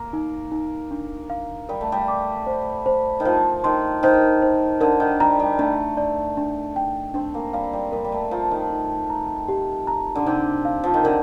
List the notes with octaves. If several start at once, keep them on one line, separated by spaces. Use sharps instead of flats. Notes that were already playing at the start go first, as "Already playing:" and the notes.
Already playing: A#3 A#5
D#4
D#4
D4
F5
G3 A#4
A3
G3
D6
C5
C5
D#3
F3 C5
D#3 C6
D#3 C5
C5
D3 A#4
D#3
G3 A#5
G3
A3 D4
D5
D4
G5
C4 D4
A#3
G3 F5
G3
G3 A#4
G3
A3
F3 A#5
D#3
D#4
A#5
G4
A#5
D3
C3 D#4
F5
F3
D#3
D3 A#4